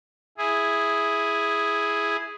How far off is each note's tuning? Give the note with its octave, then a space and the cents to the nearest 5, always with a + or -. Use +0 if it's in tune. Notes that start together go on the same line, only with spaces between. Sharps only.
E4 +0 G#4 +0